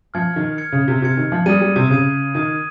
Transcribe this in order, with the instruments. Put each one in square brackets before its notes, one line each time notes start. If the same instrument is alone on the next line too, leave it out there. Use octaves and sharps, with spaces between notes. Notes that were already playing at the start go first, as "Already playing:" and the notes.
[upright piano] F3 [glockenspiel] F6 G#6 C#7
[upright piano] D#3
[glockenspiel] F6 G#6 C#7
[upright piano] C#3
C3
[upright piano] C3 [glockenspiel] F6 G#6 C#7
[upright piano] D#3
F3
[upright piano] G3 [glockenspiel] D#6 G#6 D#7
[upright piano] G3
C3
[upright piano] C#3 [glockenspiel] D#6 G#6 D#7
[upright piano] D#3 [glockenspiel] D#6 G#6 D#7